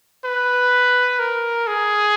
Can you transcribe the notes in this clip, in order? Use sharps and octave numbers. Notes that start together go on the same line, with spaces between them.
B4
A#4
G#4